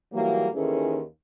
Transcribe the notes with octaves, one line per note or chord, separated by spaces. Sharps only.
G#2 E3 F#3 G3 A#3
D#2 D#3 E3 C#4 G#4 A4